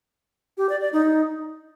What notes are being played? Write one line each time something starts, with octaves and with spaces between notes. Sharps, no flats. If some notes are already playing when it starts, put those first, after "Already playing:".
G4
D5
D5
D#4